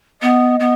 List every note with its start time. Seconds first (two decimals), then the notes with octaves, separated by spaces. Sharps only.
0.22 B3 D#5
0.60 B3